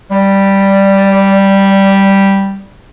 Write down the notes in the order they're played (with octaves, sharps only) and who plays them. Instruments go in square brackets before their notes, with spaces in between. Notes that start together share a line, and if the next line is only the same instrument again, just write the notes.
[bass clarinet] G3 [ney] D5